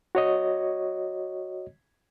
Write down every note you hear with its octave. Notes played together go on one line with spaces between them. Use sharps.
F#4 C#5 D#5